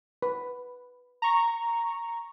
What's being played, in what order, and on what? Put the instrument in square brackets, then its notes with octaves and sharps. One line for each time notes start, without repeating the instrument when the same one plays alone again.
[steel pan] B4
[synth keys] A#5 C#6